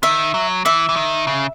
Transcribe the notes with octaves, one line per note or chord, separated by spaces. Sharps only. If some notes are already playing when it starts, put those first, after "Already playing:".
D#3 E5
F#3
E3 E5
E3
D#3
C#3